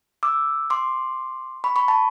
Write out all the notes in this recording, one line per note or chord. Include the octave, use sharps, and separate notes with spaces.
D6 E6
C6 D6
B5 C#6
B5 C#6
A5 B5